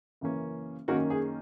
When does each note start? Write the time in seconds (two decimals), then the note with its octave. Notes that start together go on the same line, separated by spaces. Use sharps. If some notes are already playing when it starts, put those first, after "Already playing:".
0.21 F#2 C#3 E3 A#3 C#4
0.88 F#2 D#3 A#3 C#4 F#4 A#4
1.10 G#4